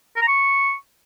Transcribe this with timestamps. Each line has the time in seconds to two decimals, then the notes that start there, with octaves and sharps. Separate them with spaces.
0.16 A#4
0.22 A#5
0.28 C#6